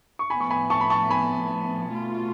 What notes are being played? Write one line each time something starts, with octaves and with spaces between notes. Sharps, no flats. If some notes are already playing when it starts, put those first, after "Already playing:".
C#6
A2 F3 B3 G#5 B5
C#6
G#5 B5
A5 C#6
B5
A5 C#6
G#5 B5
B2 A3 F4